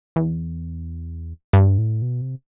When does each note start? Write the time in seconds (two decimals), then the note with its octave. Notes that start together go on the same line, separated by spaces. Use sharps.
0.16 E2
1.53 G2
1.78 A2
2.02 B2
2.21 C3